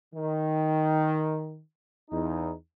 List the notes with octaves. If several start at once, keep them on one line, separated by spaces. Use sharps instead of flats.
D#3
E2 D#4